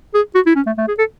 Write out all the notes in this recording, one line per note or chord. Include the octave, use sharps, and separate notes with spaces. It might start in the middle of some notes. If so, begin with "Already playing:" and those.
G#4
F#4
E4
C#4
A3
A3
G#4
A4